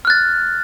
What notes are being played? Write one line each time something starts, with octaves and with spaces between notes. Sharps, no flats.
F6 F#6 A6